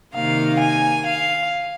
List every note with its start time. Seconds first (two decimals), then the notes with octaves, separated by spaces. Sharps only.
0.14 C3 D#3 A#3 D#4 F5
0.59 G#5
1.05 F5